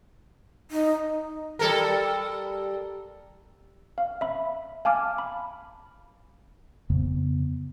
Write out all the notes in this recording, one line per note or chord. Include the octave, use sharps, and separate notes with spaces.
D#4
G3 A4 A#4
F5
E5 B5
F5 G#5 A5 D6 F6
B5
F2 C#3 B3